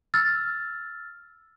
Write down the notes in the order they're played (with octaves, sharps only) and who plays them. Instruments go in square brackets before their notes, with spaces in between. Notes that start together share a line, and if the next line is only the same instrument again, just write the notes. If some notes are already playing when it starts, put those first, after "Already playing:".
[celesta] E6 F6 A6